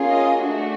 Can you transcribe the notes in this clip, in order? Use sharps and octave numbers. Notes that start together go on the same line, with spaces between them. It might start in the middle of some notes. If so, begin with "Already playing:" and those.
Already playing: A#3 C#4 F4 G#4
D#5
A3 D4 F#4